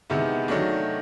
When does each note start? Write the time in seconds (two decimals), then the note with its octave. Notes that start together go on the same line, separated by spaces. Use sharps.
0.10 C3 D#3 G#3 B3 E4
0.48 D#3 F#3 A3 D4